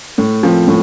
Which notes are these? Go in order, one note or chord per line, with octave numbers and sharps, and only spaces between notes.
A2
F3 C4
A2